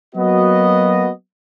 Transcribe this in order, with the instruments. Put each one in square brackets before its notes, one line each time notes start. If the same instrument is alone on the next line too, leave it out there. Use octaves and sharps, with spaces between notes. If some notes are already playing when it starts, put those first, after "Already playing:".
[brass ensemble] F#3 A#3 B3 F#4 D#5